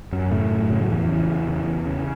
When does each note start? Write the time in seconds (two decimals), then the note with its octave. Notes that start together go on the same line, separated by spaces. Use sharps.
0.12 F#2 F#3
0.31 A2 C#3 A3
0.50 F#2
0.70 C#3
0.81 F#3
0.90 E2 E3
1.09 C#3
1.28 E2
1.48 C#3
1.67 E2
1.87 C#3